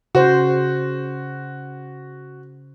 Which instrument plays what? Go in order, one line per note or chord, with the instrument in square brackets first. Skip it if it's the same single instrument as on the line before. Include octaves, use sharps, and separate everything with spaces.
[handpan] C#3 C5 [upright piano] F#4